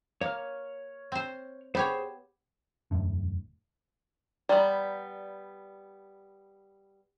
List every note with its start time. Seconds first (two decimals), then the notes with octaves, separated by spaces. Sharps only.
0.21 A#3 C#5 F6
1.12 C4 C5
1.75 B3 G4 G#4 C5 C#5
2.91 E1 F#2 A2 D3
4.49 G3 B3 D5 A#5 C6